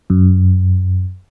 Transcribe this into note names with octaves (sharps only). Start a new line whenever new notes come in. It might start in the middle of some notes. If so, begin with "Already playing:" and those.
F#2